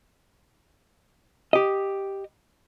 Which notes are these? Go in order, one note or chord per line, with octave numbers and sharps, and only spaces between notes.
G4 D#5